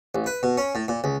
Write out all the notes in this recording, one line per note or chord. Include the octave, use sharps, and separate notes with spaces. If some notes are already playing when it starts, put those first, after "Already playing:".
A1
B4
B2
C#4
A2
A#2
C#2